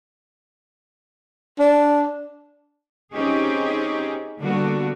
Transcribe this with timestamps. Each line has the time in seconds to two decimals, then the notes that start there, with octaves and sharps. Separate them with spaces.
1.60 D4
3.11 C4 C#4 D#4 G4 G#4
4.40 D3 G3 A#3 B3 D4 F#4